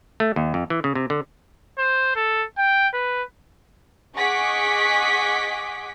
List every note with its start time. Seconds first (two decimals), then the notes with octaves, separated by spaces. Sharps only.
0.20 A3
0.36 D#2
0.54 F2
0.70 E3
0.84 C#3
0.95 C3
1.10 D3
1.78 C5
2.16 A4
2.58 G5
2.93 B4
4.17 G#4 D#5 F#5 C#6 D6 B6